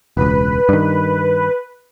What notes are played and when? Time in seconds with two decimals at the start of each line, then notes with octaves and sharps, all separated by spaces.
0.17 E1 C#2 B4
0.69 G2 D#3